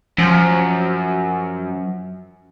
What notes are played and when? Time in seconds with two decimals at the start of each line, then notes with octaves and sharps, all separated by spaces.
0.18 F#2 F3